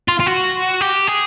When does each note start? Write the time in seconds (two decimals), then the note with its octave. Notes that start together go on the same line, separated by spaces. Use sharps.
0.08 F4
0.20 F4
0.26 F#4
0.81 G4
1.08 G#4